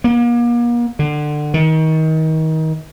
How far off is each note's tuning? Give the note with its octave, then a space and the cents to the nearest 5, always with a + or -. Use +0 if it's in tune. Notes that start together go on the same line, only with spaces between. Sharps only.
A#3 +40
D3 +25
D#3 +30